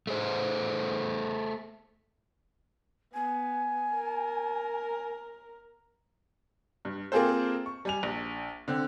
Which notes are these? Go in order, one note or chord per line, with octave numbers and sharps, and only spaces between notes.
A3 G#4 C5
B3 G#5
A#4
G2
A#3 C4 F4 G#4 A4 C5
C#6
G3 G#5 F7
A#1
D3 C4